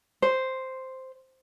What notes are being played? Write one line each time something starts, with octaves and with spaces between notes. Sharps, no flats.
C5